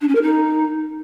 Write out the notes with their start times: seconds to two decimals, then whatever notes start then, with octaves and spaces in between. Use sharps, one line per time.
0.01 D4
0.08 C#4
0.15 A#4
0.22 D#4